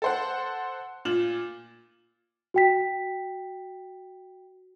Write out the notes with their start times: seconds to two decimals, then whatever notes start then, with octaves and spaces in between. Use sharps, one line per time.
0.02 A4 C5 F#5
1.05 A#2 F4 E7 F#7
2.54 F#4 G5 B6